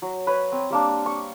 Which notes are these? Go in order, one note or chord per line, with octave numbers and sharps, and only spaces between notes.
F#3
B4 C#5 B5
C4
G3 A#3 D4
C#6